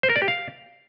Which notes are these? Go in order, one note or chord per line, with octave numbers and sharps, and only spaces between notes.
C5
A#4
D5
G4
F5